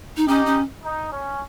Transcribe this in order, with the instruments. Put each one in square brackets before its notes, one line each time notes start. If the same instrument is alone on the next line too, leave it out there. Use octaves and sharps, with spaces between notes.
[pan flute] D#4
[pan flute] C#4 [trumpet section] D#4 G4
[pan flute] C#4
[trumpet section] D#4
C#4